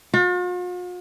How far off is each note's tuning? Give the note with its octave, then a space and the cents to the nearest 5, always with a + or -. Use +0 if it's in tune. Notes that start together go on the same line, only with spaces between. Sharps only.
F4 +45